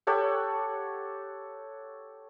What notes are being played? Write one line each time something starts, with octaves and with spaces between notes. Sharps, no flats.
G4 A4 C#5 F#5